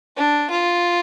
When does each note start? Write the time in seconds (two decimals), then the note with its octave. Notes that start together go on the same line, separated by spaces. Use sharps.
0.17 D4
0.51 F4